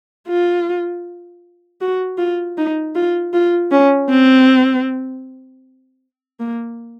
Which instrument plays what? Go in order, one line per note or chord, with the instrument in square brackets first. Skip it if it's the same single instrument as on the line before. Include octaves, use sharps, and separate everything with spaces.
[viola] F4
F#4
F4
D#4
F4
F4
C#4
C4
A#3